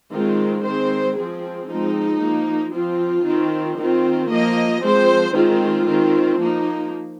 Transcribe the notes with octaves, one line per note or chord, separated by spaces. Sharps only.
D#3 G#3 C4 F4
D#3 G#3 C4 C5
F3 C4 G#4
F3 G#3 C4 D#4
F3 A#3
F3 C4 F4
D#3 C4
D#3 C4 F4
F3 A#3 D#5
F3 G#3 C4 C5
D#3 G#3 C4 F4
D#3 C4
F3 A#3 D#4